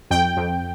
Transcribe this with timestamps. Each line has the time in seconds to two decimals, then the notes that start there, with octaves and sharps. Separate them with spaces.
0.10 F2 G5
0.37 F2